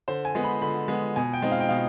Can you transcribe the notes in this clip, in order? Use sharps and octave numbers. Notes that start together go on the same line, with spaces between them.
D3 C5
G#5
G#3 B3
B5
D3 B5
G#3 B3
B2 G#5
G5
G#3 C4 D#4
F5
G5
B2 F5